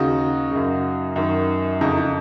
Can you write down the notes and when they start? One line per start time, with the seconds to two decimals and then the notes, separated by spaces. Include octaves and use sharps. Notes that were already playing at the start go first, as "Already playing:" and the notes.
Already playing: D#2 C#3 D#4 F#4
0.51 F#2 C#3
1.16 F#2 D#3
1.81 F2 C#3 D#4
1.97 D#4